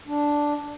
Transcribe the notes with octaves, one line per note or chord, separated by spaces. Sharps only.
D4